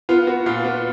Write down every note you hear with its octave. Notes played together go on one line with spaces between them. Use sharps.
B3 F4
B3 F#4
A#2 F4
B3